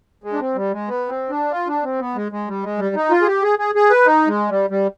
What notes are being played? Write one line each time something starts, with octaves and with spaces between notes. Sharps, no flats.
G#3
D4
C4
G3
G#3
B3
C4
D4
F4
D4
C4
B3
G#3
G#3
G3
G#3
G3
D#4
F4
G#4
G4
G#4
G#4
G#4
B4
D#4
G#3
G3
G3